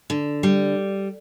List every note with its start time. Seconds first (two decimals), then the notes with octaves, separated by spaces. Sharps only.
0.10 D3
0.43 G3